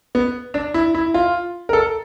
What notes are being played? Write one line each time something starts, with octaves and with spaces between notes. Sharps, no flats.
B3
D4
E4
E4
F4
A#4
A4